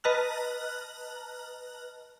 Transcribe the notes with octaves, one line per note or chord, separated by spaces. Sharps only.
B4 D#5 A5 A#5 F6 F#6